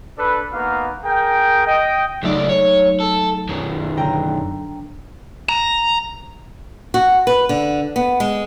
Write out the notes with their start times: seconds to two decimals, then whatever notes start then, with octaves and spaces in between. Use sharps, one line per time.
0.18 D4 A4 B4
0.53 A#3 B3 D#4 F#4 F5
1.03 G#4 A#4 G5
1.67 D#5 G5
2.23 C#2 F#3 A3 D#4 D5
2.49 C#5
3.00 A4
3.49 F#2 D#3
3.97 D3 G5 A#5
5.49 A#5
6.94 F#4
7.27 B4
7.49 D3
7.96 B3
8.20 G#3